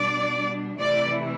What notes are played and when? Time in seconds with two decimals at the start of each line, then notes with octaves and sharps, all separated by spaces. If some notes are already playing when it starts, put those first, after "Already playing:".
Already playing: B2 G3 D4 D5
0.80 C3 E3 A3 E4 D5